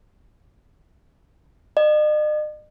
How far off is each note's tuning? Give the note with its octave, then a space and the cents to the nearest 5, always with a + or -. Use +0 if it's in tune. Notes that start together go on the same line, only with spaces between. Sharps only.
D#5 -45